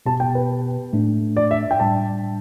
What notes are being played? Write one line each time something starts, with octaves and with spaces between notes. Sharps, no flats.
B2 B3 G4 A5
G5
B4
A2 A3 D4
D5
E5
G5
A2 G3 D4 A5